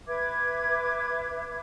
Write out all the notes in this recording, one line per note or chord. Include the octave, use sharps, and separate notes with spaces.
B4 E5 D6 G#6